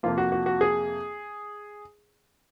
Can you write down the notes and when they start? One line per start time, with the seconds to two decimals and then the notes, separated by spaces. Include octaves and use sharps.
0.03 F2 C3 F3 A#3 F4
0.18 F#4
0.32 F#4
0.46 F#4
0.61 G#4